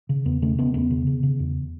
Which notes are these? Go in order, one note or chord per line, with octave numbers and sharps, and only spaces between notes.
C#3
E2 B3
C#3 A3
C#3 B3
E2 B3
C#3
C#3
C#3
E2